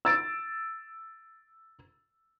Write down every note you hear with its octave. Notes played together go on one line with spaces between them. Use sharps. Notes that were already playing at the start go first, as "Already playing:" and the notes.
E6 A6 D7